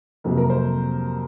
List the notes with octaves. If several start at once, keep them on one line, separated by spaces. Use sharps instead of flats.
F2 C3 F#3 A#3
A#4
C5